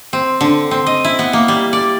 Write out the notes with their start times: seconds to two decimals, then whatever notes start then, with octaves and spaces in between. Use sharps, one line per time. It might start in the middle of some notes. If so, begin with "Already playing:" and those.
0.13 C4
0.41 D3
0.71 C4
0.87 D#5
1.05 E4
1.19 B3
1.33 A#3
1.48 G3
1.73 D5